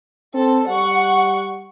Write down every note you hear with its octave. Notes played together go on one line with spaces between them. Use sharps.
C4 A4
G3 F#5 C#6